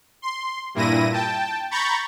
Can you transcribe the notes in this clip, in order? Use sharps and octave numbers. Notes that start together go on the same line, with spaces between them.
C6
G2 A#2 E4 A#6 D#7
G5 A5
A#5 B5 C#6 G6 A6